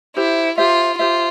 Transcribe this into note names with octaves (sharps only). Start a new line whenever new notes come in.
E4 G4 C5 E5
F4 G4 C5 E5
F4 G4 C5 E5